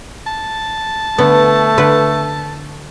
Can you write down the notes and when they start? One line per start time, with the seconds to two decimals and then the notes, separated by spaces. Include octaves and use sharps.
0.27 A5
1.18 D3 A3 B3
1.78 D3 B4